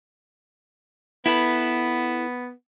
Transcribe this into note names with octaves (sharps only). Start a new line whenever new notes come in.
B3 E4 A4 B4